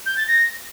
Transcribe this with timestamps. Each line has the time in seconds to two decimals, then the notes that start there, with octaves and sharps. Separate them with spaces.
0.06 G6
0.17 A6
0.28 A#6